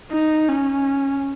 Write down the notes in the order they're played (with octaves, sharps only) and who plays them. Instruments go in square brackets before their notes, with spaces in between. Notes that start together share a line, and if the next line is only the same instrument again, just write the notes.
[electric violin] D#4
C#4